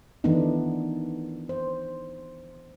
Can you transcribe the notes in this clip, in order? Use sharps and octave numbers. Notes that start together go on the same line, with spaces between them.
D#3 E3 A3 B3 D4 D#4
C5